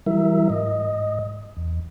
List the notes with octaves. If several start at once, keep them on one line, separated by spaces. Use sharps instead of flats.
E3 F#3 G3 E4 A#4 E5
G#2 D#5
E2